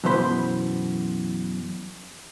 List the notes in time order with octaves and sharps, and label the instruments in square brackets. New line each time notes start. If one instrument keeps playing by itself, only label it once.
[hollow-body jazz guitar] F#2 B2 E3 C5 B5